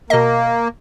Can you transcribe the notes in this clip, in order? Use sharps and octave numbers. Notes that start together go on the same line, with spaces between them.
B2 A#3 D#5